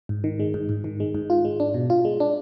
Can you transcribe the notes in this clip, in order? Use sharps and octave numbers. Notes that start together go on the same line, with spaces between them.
G#2
D#3
G#3
G#2
G#2
D#3
G#3
G#2
F4
G#3
D4
B2
F4
G#3
D4